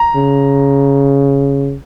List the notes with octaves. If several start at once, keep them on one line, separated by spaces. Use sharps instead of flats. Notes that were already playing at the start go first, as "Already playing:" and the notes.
Already playing: A#5
C#3